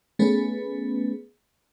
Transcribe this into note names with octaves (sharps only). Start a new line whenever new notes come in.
A3 B3 C#4 G#4 B4